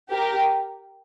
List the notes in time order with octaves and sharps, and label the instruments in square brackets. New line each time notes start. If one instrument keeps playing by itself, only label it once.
[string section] G4 A#4